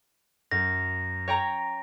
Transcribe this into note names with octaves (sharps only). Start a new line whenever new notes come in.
F#2 A#6
C#5 G5 A#5